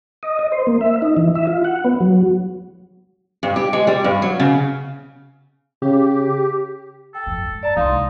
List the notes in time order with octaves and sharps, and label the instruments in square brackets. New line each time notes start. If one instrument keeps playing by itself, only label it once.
[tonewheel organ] D#5
D#5
C5
A#3
E5
D#4
E3
E5
F4
F#5
B3
F#3
[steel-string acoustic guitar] G2
G4
G#3
G3
G2
F#3
C#3
[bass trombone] C#3 [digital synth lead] G4
[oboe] A4 [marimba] G5
[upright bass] F2 G#2
G#2
[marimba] D5 A#5 [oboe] A5
[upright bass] C2 G#3 [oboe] D#4 [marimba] F5 C6